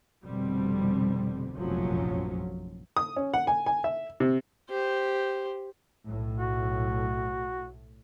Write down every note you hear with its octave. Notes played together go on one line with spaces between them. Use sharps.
F1 B2 D3 G3 C4
F1 A#1 F#2 F3 F#3 C#4
D#6
C#4
F#5
G#5
G#5
E5
C3
G4 C5
B1 A2
F#4